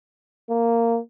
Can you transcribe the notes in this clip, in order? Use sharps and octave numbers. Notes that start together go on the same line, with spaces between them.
A#3